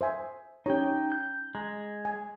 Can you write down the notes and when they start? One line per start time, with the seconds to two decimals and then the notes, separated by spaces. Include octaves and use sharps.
0.01 C5 E5 G#5
0.66 C#4 D#4 G4 C#5 G5
1.12 G6
1.55 G#3 A#5
2.05 G#5